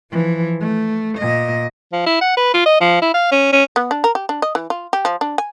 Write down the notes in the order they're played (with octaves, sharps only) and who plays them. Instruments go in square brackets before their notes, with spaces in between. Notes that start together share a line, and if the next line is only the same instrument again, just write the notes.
[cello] E3 F3
A3
A#2 D#5
[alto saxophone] F3
E4
F#5
B4
F4
D#5
F3
E4
F5
C#4
C#4
[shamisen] B3
D4
A#4
G4
D4
D#5
E3
F4
G4
F3
D4
G#5